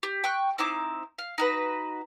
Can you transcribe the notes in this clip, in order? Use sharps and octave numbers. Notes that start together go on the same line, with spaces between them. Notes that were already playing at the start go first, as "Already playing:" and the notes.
G4
G5 C#6 F#6
C4 D#4 E4 D6
F5
D#4 F#4 B4